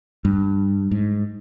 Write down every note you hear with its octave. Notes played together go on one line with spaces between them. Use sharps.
G2
G#2